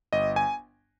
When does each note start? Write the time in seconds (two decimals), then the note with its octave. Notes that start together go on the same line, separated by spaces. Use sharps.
0.13 G1 D#5
0.36 G#5